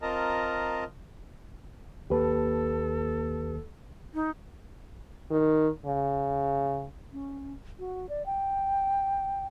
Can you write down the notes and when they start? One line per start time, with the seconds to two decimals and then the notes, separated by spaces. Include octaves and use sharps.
0.02 C4 F4 A#4 D#5 A5 A#5
2.10 D#2 A#3 G4 A4 B4 A5
4.14 D#4
5.30 D#3
5.86 C#3
7.12 C#4
7.79 F#4
8.09 D5
8.26 G5